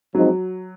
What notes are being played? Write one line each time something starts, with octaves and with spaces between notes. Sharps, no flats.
F3 F#3 G#3 C4 D#4